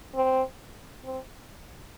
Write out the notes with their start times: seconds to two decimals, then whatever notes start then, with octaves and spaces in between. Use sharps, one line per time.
0.15 C4
1.05 C4